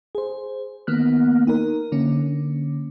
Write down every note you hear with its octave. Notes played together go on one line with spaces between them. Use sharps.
G#4 C5
D#3 A#3 B3 F6 F#6
D#4 A#4
D3 A#3 C#4